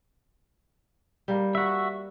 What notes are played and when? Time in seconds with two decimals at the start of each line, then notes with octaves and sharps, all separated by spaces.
1.28 G3 A#3
1.55 F#4 E5